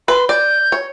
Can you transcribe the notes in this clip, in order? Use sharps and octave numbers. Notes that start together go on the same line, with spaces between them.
B4 C6
D5 G6
C#5